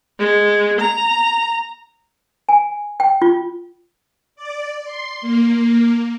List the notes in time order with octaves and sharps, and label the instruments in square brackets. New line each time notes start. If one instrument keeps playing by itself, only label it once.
[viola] G#3
A#5
[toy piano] G#5
G5
F4
[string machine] D5
C6
A#3